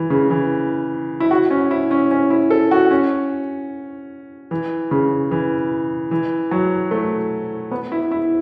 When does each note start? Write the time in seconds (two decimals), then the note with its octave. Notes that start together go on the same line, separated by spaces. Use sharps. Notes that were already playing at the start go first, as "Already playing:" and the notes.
Already playing: E3
0.10 C#3
0.30 E3
1.20 E4
1.31 F#4
1.50 C#4
1.71 E4
1.91 C#4
2.11 C#4
2.30 E4
2.51 A4
2.71 F#4
2.91 C#4
4.51 E3
4.91 C#3
5.31 E3
6.11 E3
6.51 F#3
6.91 A3
7.71 B3
7.92 E4
8.11 E4